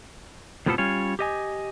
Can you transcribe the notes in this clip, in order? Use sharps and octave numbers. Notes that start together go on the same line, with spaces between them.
F2 A2 C3 F3 B3 A4
G3 C#4 F4 C#5
G4 D#5 G#5